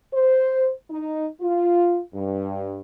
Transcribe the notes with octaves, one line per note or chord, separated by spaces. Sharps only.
C5
D#4
F4
G2